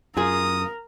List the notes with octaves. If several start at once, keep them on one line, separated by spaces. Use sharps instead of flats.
F#2 F4 G#4 A#4 D#6